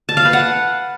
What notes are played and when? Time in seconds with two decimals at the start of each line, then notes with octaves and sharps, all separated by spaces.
0.09 A5
0.17 F5
0.25 B4
0.33 F#5